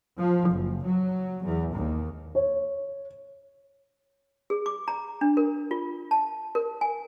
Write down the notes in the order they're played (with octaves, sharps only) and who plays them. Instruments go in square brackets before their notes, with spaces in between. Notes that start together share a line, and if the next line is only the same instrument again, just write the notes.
[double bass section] F3
F#1
F#3
E2
D#2
[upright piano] C#5
[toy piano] G#4
D6
A#5
D4
A#4
F4
A5
A#4
G#5